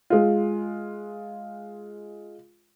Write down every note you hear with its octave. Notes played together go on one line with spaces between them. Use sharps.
G#3 F4